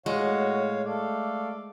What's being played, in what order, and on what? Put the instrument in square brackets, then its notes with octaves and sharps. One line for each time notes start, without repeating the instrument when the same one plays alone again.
[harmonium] A2 C#5 F5 [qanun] G#3 [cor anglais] F#4
[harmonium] A3 A4 F5 [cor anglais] D5